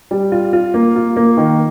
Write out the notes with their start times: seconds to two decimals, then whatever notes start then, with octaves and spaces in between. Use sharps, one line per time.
0.11 G3
0.32 F4
0.53 F4
0.74 A#3
0.96 F4
1.16 A#3
1.37 D#3